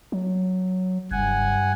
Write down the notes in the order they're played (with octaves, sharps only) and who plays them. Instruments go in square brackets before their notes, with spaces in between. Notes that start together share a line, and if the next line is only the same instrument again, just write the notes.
[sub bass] F#3
[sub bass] F#1 [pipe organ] G2 F#5 G#5